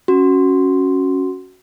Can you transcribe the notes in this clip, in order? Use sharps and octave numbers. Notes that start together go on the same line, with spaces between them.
C#4 F#4